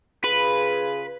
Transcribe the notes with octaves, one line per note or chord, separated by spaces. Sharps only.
C#3 F4 G#4 B4